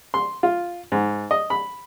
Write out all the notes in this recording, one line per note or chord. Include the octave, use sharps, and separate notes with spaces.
C6
F4
G#2
D#5
B5